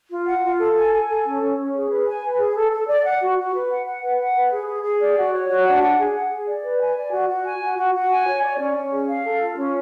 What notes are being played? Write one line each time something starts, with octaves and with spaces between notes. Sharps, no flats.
F4
F#5
F4
A4
G#5
G#5
A4
C#4
C#4
C#4
G#4
B4
G#5
B4
G#4
A4
A4
D5
F#5
F#4
F#4
B4
F#5
F#5
B4
F#5
B4
G#4
G#4
G#4
D5
F#4
C#5
F#4
D4
F#5
G#4
F#5
G#4
D5
B4
G#5
D5
F#4
F#4
G#5
F#4
F#4
F#4
G#5
C#5
D5
C#4
C#4
G#4
F5
A4
F4
C#4